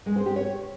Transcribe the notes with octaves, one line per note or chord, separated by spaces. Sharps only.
G#3
C5
G4
C#5